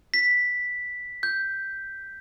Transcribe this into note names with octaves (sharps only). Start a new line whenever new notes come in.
B6
G6